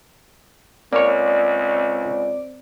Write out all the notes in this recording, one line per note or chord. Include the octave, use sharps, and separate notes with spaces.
C#2 A#3 C4 C#5 D5